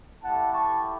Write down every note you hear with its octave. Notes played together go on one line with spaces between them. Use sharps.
A3 E4 G4 F#5 A5
A5 C#6